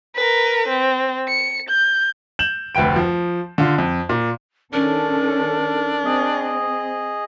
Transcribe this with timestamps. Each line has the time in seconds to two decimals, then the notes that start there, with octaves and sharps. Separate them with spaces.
0.16 A#4 B4
0.68 C4
1.28 C#7
1.69 G6
2.39 G6 E7 F#7
2.75 F1 D2 B4 G5 D7
2.96 F3
3.58 D3 F4
3.78 F2
4.09 A#2
4.73 D#3 C#4 D4 A4 A#4
6.05 C4 G#4 D#5